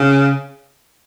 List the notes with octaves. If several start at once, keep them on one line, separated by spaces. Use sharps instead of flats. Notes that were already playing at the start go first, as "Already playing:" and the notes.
Already playing: C#3